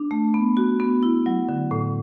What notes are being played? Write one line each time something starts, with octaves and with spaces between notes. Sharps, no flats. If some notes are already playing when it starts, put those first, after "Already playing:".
Already playing: D4
A3
B3
F#4
B3
E4
F#3
D3
A2